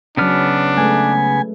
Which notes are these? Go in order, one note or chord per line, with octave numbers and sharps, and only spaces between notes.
C#3 F#3 B3 C#4 D4 F6
G#3 A3 B4 G#5